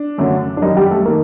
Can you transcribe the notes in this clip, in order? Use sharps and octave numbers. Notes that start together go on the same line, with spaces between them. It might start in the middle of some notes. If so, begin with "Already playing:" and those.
Already playing: D4
F#2 D3 F#3 A3
D4
F#2 D#3 G3 D#4
G3 G4
A3 A4
D#3 A#3 A#4